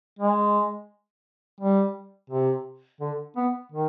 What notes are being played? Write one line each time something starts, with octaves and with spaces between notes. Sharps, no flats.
G#3
G3
C3
D3
B3
D#3